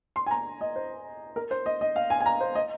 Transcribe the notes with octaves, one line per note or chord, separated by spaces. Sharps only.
C6
G#5
A#5
D#5
C5
A#4
C5
D#5
D#5
F5
G#5
G#5
A#5
C5
D#5